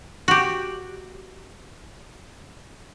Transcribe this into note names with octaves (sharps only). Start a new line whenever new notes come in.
F#4 G4